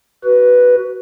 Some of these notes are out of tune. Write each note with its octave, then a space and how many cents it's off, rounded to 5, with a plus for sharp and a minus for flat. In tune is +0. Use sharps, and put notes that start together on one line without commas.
F#4 +20 B4 +0